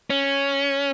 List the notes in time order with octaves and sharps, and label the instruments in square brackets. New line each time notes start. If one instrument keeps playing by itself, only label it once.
[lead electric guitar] C#4